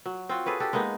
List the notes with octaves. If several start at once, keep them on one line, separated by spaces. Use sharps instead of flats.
F#3
C4 F4 F#4
G#4 A4 B4 C#5
D4 G4 A4
G#3 A#3 B3 D#4